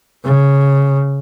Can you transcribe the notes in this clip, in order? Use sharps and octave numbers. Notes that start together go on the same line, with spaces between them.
C#3